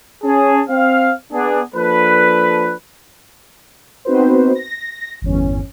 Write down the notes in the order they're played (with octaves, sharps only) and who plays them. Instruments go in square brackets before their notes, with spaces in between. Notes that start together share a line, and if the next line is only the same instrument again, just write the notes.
[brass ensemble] C#4 G#4 A5
C4 F5
B3 D4 G#4
F3 A#3 D4 A4 B4
[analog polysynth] B3 C4 D#4 F#4 B4 C5
A#6
G1 E2 C#4